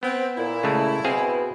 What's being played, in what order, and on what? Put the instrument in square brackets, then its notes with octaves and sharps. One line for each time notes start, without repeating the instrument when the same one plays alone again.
[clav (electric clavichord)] B3 [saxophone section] C4
[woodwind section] A#2 [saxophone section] E4
[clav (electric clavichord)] C#3 G#3 A3
[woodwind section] B2 [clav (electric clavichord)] C4 G#4 F5